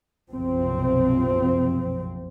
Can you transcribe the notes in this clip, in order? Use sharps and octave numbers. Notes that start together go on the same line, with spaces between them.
F#1 B1 F2 C3 F3 C4